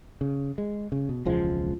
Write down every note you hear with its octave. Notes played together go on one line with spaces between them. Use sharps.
C#3
G#3
C#3
B2
E1 C#2 F3 G#3